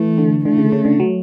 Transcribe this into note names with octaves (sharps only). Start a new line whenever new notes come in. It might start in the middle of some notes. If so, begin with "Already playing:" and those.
Already playing: E3 A3
D3
D3 A3
C#3
C#3
D3
F#3